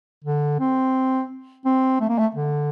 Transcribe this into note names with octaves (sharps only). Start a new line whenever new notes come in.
D3
C4
C4
A3
A#3
A3
D3